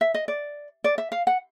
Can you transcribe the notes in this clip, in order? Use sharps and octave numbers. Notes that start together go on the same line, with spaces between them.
E5
D#5
D5
D5
E5
F5
F#5